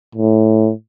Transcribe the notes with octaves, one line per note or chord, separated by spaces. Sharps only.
A2